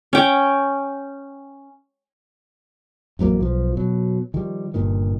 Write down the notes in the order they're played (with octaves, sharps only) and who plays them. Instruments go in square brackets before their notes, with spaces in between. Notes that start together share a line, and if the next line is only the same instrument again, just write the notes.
[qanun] C#4 G5
[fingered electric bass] A1 F2 F#3 A#3
B1 F3
B2 F#3
D#3 F3 G3
G1 G2 A#2 D#3